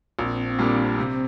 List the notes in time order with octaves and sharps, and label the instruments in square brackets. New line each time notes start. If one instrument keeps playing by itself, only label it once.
[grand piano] A#1 [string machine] C4
[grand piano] A#2 G3 D4 [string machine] C4
[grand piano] C3